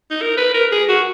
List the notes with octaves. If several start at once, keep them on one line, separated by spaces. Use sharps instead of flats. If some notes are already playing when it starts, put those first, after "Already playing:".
D#4
A#4
B4
A#4
G#4
F#4